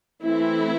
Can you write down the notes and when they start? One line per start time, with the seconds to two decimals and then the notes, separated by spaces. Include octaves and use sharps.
0.23 E3 A3 C4 E4